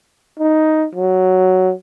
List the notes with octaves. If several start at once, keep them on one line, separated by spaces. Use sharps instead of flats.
D#4
F#3